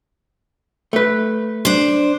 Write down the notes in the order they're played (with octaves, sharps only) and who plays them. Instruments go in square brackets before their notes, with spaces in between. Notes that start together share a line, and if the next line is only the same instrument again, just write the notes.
[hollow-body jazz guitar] A3 B4
[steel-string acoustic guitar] D4 C5